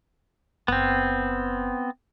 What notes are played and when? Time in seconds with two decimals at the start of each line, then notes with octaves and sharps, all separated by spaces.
0.68 F#1 B3 C4